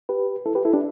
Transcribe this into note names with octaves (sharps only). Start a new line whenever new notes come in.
G4 B4
E4 A4
G4 B4
E4 A4
D4 G4